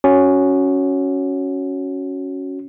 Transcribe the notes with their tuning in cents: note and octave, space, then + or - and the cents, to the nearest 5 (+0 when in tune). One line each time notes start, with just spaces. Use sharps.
C#4 +0 F#4 +0